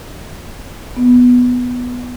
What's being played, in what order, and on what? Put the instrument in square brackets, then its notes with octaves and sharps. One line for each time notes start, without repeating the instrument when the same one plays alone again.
[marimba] B3